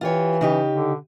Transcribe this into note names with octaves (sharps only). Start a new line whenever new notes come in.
E3 F4 G4 C#5
C#3 D#4 G4
D3